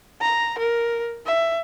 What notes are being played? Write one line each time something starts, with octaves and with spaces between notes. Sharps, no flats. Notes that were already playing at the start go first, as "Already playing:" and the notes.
A#5
A#4
E5